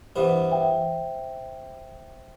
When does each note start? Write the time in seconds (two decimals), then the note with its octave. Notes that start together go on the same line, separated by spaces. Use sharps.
0.16 G2 E3 B3 C5
0.51 E5 G5